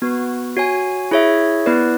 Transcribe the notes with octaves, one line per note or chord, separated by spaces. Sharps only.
B3 F#4 B4
F#4 C#5 G#5
E4 G#4 C#5 E5
B3 E4 B4 D5